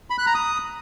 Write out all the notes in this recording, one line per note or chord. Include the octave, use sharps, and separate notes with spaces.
B5
F#6
A#5
D#6